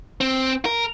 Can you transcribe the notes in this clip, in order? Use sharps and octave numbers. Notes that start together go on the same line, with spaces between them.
C4
A#4